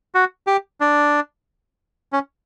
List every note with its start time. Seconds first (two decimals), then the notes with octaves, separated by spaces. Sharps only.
0.15 F#4
0.47 G4
0.81 D4
2.13 C#4